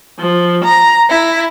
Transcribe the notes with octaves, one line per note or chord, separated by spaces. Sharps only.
F3
A#5
E4